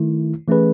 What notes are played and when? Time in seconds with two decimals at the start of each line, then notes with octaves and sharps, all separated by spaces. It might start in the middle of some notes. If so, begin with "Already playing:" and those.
Already playing: D#3 A3 E4
0.48 E3 A3 C#4 G#4 B4